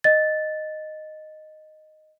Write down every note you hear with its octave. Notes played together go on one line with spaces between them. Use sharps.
D#5 A6